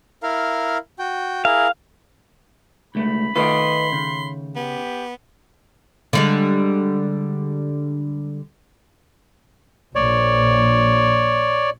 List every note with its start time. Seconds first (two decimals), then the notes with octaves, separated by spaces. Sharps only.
0.23 E4 A#4 F5
0.99 F#4 G5
1.45 E4 G#4 A#4 F5
2.95 C#2 A3 B5
3.36 D#3 A3 F4 B4 D#5 C6
3.93 C#3
4.56 B3 G4
6.13 D3 G3 G#3
9.95 A#1 C#5 D5